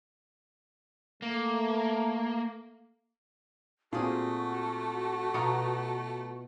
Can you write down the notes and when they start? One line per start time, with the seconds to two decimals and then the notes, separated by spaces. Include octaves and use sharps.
1.22 A3 A#3
3.93 A#2 A3 C4 F#4 G#4 F5
5.34 B2 F4 A#5 C#6 C#7